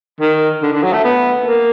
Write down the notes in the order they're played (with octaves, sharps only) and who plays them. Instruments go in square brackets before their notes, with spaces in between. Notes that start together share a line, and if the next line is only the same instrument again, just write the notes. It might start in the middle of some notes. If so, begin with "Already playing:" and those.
[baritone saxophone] D#3
D3
D3
F#3
A3
B3
A#3